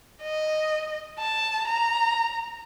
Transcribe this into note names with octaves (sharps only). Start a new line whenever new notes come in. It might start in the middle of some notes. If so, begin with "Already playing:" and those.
D#5
A5
A#5